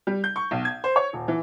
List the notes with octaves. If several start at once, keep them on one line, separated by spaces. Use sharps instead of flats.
G3
G6
C#6
B1
G#6
C5
C#5
D#1
E3